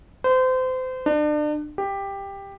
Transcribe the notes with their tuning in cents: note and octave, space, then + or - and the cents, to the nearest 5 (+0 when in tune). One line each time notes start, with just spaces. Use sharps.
C5 -30
D4 +35
G4 +10